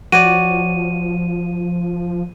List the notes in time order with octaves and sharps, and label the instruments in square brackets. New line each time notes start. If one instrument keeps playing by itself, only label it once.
[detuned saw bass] F3 [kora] F#4 C#5 D5 [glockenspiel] D#7